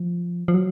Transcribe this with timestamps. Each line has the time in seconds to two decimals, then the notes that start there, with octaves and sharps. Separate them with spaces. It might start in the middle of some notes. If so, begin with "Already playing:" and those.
Already playing: F3
0.48 F3
0.54 F#3